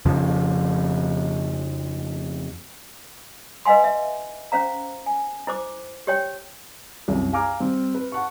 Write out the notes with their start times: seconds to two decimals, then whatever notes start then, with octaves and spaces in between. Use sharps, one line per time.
0.05 F2 C#3 F3
3.65 B4 D#5 F5 G#5 C6
3.84 E5
4.52 C#4 C5 F5 A#5
5.06 G#5
5.47 E4 C5 D6
6.07 G4 C#5 G5
7.08 C2 F#2
7.33 F5 G#5 A#5 D6 F6
7.60 G3 C4
7.95 B4
8.12 F#5 A5 C#6